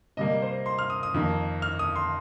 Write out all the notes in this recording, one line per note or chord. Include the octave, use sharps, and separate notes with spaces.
C3 G3 A#3 D#5
C5
C6
F6
D#6
D#6
F2 D#3 A#3
F6
D#6
C6